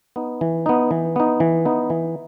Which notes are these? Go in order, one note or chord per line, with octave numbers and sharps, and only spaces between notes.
B3 D#4
E3
B3 D#4
E3
B3 D#4
E3
B3 D#4
E3